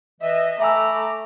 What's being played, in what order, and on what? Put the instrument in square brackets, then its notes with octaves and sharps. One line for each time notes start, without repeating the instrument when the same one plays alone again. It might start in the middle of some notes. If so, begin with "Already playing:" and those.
[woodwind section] E3 D#5 [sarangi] E5
[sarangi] A3 [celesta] E5 G#5 E6 [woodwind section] A#5 B5 D6